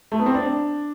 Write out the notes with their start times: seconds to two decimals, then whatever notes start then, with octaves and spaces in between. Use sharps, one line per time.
0.12 A3
0.19 B3
0.26 C4
0.35 D4